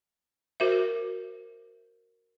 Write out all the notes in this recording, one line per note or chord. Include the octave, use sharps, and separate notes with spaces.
F#4 A#4 C5 E5